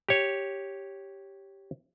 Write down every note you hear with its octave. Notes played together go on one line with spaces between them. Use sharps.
G4 C#5